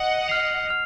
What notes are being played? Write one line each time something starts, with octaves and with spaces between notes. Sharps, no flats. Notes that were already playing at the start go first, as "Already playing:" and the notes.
Already playing: D#5 F#5
F6 C7 F7
F6 F7